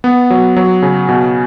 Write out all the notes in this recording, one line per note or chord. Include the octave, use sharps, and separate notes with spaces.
B3
F#3
F#3
C#3
B2